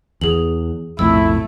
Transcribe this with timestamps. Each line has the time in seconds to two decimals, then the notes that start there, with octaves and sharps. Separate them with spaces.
0.21 E2 G#4 F#7
0.99 B1 F2 A2 A3 E4 E6